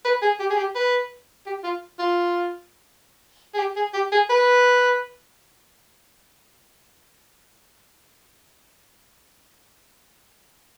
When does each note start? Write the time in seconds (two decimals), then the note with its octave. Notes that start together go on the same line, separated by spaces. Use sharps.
0.05 B4
0.22 G#4
0.40 G4
0.50 G#4
0.57 G4
0.75 B4
1.46 G4
1.64 F4
1.99 F4
3.54 G#4
3.59 G4
3.76 G#4
3.94 G4
4.12 G#4
4.30 B4